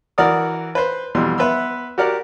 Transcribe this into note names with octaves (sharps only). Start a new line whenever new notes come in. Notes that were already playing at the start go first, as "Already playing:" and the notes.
E3 F#4 A#4 D5 F#5 D#6
B4 C5
F2 B2 E3 G3 C6
B3 B4 E5 C6 E6
F#4 G4 A#4 D5 F#5